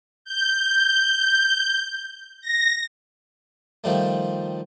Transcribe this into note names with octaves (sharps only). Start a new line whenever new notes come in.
G6
A#6
D#3 F3 G3 A3